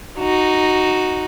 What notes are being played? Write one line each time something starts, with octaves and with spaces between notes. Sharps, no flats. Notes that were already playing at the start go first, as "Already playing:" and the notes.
D#4 F#4